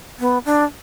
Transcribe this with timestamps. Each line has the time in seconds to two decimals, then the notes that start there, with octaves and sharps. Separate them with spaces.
0.20 B3
0.45 D4